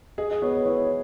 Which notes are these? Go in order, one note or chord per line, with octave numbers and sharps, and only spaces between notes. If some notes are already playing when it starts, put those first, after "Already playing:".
G#4 D#5
D#5
B3 C#5
B4
E4 C#5